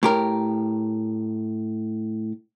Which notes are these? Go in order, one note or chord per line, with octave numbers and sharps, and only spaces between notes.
A2 G4 A#4